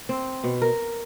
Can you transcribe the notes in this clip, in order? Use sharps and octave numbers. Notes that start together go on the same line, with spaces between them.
C4
B2
A#4